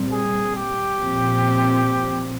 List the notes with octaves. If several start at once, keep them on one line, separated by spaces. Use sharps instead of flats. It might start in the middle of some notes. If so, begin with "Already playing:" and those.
Already playing: A#2 G3 C4
G#4
G4
A#2 F3 C4